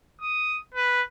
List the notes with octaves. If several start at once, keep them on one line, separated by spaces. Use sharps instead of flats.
D#6
B4